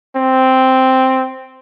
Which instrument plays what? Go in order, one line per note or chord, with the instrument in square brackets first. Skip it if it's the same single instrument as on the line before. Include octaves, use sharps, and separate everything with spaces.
[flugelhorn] C4